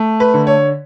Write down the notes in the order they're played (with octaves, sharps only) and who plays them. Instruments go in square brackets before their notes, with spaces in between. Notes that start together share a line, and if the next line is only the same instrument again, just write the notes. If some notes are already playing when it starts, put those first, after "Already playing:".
Already playing: [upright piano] A3
B4
D3
C#5